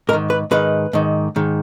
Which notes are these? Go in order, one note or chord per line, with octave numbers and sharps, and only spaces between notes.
G#2 D#3 A#4
B4
G#2 D#3 B4
G#2 D#3
G#2 D#3